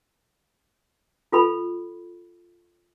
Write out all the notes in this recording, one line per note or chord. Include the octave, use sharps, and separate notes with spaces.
F4 A4 B5